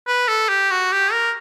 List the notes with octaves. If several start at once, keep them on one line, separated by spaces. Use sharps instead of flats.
B4
A4
G4
F#4
G4
A#4